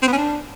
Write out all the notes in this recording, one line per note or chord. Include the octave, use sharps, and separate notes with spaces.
C4
B3
C#4
D4